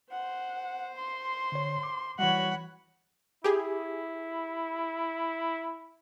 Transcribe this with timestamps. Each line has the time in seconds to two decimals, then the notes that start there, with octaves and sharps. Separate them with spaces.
0.11 C5 F#5
0.97 C6
1.52 D3 C#5
1.83 D6
2.19 E3 G3 F#4 C#5 F#5 B5
3.44 E4 G4 G#4